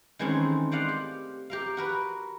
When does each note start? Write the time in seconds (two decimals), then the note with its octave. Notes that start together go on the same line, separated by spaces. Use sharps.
0.19 D#3 E3 G#3 A3 C4 C#4
0.71 C5 D5 D#5 F5 F#5
0.88 G4
1.50 G4 A#4 F5
1.77 F#4 A#4 B4